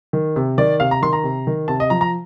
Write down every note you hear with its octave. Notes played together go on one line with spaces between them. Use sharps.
D#3
C3
D#3 D5
C3 F5
A#5
D#3 C6
A#5
C3
D#3
C3 A5
D#5
F3 A#5
A#5